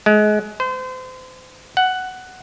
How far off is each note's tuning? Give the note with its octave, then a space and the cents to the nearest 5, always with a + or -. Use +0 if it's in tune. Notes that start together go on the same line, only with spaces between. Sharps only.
G#3 +30
C5 -35
F#5 +10